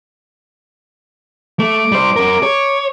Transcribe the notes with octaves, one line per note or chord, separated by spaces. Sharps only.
A3 D6
G3 C5
C#4 A#4
C#5